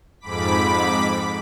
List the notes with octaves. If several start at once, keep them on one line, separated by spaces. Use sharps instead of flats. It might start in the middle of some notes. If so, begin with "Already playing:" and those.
F2 G#2 B5 D6 B6